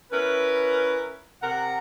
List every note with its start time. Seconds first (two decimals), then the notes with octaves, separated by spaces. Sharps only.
0.12 C#4 E4 A#4 B4
1.42 C3 A#4 F#5